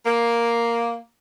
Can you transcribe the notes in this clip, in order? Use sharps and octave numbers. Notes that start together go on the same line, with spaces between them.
A#3